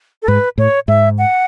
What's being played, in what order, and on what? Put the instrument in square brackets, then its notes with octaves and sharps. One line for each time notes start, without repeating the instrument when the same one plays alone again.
[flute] A4
[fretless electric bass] G#2 [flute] B4
[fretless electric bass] A2 [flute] C#5
[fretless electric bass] G#2 [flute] E5
[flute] F#5